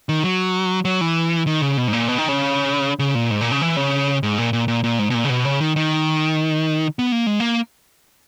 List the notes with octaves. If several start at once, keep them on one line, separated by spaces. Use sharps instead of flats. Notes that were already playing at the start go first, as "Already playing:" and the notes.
D#3
F#3
F#3
E3
D#3
C#3
B2
G#2
A#2
B2
D#3
C#3
C#3
A#2
G#2
A#2
C#3
E3
C#3
G#2
A#2
A#2
A#2
A#2
G#2
B2
A#2
C#3
B2
C#3
D#3
D#3
B3
A#3
G#3
A#3